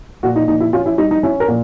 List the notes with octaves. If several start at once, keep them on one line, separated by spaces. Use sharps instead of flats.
A#2 F#4
D#4
A#2 D#4
E4
C#4 F4
E4
G3 D#4
D#4
C#4 E4
A#4
A#2